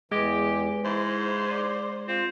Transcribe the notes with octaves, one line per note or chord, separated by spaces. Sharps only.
E2 E3 G#3 G4
G#2 E4 C5
D5
C4 F4